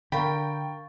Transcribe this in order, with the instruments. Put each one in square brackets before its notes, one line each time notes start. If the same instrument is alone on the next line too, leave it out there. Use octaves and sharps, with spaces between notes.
[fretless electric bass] D3 [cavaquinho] A#4 B5 [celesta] F5 C#6 A6 [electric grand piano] G5